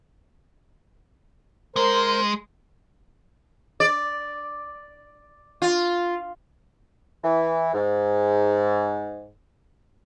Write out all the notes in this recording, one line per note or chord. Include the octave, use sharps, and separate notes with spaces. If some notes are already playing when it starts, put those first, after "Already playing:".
G#3 A#4 C5
D5
F4
E3
G#2